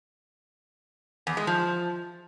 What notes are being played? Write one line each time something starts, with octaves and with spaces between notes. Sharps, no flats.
E2
G#3
F3